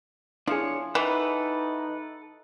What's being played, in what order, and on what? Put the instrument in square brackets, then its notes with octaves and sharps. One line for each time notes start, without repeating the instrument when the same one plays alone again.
[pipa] F3 [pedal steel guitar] D4 C#5 [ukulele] E4 G#4
[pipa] E3 [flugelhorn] D#4 [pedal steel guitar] A4 B4 F#5